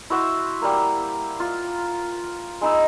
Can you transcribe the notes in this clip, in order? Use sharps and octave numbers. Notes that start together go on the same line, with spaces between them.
E4 F#4 C5 E5
G3 A#3
F4
G#3 D#4 B5 E6